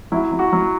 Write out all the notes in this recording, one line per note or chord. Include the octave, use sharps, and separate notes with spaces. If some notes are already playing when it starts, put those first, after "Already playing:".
F#3 E4
F#3
F#4
F#3